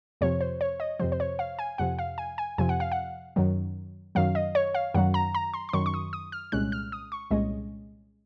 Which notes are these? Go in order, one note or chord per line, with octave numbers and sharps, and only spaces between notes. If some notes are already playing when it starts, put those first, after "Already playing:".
F2 C3 F3 C#5
C5
C#5
D#5
F2 C3 F3 C5
C5
C#5
F5
G#5
F2 C3 F3 F#5
F5
G#5
G#5
F2 C3 F3 G#5
F#5
F5
F#5
F#2 D#3 F#3
F#2 D#3 F#3 F5
D#5
C#5
F5
F#2 D#3 F#3 F#5
A#5
A#5
C6
C6
F#2 D#3 F#3 C#6
C#6
D#6
D#6
F6
C2 A#2 G#3 C#4 F#6
F6
D#6
C#6
C2 A#2 G#3 C#4 D#5